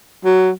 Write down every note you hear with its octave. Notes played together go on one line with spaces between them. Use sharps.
F#3